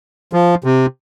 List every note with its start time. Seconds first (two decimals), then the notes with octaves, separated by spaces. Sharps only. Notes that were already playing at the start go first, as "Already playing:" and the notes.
0.33 F3
0.64 C3